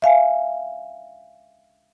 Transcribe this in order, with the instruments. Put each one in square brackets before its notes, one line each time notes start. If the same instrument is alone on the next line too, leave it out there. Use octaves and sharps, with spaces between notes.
[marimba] E5 F5 G#5